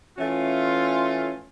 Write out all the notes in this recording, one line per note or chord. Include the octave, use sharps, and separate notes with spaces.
E3 A3 C#4 F4